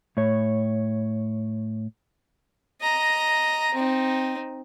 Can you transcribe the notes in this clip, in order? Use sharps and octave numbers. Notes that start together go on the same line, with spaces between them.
A2 C#5
D#5 A#5
C4 D#4